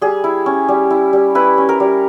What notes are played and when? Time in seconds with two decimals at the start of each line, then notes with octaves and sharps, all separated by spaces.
0.01 G3 G#4
0.24 E4
0.46 C#4
0.68 G3
0.90 E4
1.13 G3
1.35 E4 B4
1.58 C#4
1.69 A#4
1.80 G3